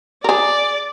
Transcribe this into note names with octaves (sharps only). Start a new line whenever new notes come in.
G#4 A#4 D5